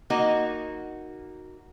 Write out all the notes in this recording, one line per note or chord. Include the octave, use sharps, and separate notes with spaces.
A#3 D#4 F#4 D#5